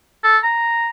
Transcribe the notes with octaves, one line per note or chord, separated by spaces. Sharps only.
A4
A#5